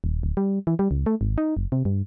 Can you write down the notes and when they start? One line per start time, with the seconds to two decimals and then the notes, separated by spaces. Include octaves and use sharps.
0.04 D#1
0.23 D1
0.37 G3
0.67 E3
0.79 G3
0.91 C#2
1.06 A3
1.21 G#1
1.38 D#4
1.57 F#1
1.72 C3
1.85 G2